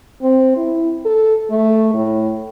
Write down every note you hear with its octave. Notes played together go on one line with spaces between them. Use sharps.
C4
E4
A4
A3
A2